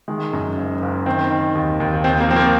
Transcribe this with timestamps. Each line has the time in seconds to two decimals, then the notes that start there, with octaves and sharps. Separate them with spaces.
0.08 D#3 G#3
0.33 F#2
0.57 F#1
0.82 F#1
1.06 D#3 C4
1.30 D#3
1.55 D#2
1.80 D#2
2.04 D#2 C4
2.20 A#3
2.28 F3 C4
2.36 A#3